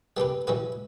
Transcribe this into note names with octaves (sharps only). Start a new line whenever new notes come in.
G3 B3 D4 G4 B4
E3 G3 C#4 F#4 B4